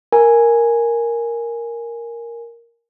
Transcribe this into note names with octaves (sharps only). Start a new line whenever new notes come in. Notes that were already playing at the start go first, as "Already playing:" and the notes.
A#4 G#5